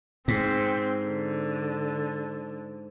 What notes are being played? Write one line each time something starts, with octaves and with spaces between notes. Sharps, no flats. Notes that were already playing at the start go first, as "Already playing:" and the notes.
G#2 C4
D3